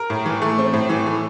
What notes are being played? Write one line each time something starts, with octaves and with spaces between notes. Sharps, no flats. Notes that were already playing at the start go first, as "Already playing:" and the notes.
Already playing: A#4
A2
E3
A3
C4
A2
E3
A3